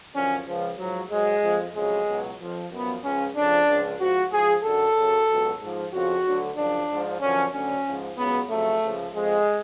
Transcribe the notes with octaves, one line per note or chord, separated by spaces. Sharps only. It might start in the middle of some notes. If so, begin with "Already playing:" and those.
F#2 D3 F3 C#4
C#2 C#3 F3
G#2 F3 F#3
G#2 F#3 G#3
F2 F3
F2 C#3 F#3 G#3
C#2 B2 F#3
F2 F3
F#2 F3 B3
C#2 C#3 F3 C#4
F2 C#3 F3 D4
C#2 C#3 F3
G#2 F3 F#4
G#2 F3 G#4
F#2 D3 F#3 A4
F#2 C#3 F#3
C#2 B2 F#3
G#2 F3
F2 C#3 F3 F#4
D2 D3 F#3
F#2 C#3 F3 D4
G#2 F3
F#2 D3 F3 C#4
D2 D3 F#3 C#4
G#2 F3
C#2 C#3 F#3 B3
F2 C#3 F#3 A3
C#2 C#3 F3
F2 F3 G#3